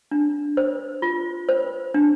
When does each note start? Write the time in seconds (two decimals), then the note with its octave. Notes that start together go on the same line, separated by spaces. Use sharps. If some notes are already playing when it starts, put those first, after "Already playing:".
0.11 D4
0.57 C5
1.02 F4
1.49 C5
1.94 D4